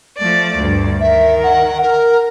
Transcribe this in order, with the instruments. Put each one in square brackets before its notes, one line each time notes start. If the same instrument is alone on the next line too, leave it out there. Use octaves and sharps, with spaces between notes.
[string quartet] F3 A3 D5
D2 G2
[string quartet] D#3 A#4 [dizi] E5
[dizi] F#5
A#4